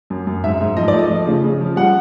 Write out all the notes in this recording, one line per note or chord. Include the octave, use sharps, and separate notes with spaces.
F#2
F#2
G#2 E5
G#2
F3 D#5
D5
A3
D#5
F3
C#3
C#3
F3
G3 F#5